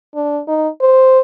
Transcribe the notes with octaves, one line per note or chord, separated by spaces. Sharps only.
D4
D#4
C5